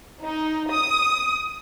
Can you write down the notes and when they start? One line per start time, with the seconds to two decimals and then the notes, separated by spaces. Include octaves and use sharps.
0.20 D#4
0.71 D#6